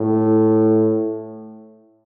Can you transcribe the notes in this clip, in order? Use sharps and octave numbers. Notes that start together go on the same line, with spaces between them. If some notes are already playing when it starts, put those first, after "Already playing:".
Already playing: A2